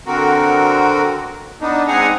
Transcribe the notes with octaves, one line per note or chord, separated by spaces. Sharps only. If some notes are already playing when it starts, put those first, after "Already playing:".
D3 C4 F#4 A#4
B3 D4 D#4
G#2 C4 G#4 F#5 G#5 A#5